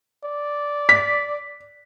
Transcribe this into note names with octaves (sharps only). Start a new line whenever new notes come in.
D5
B6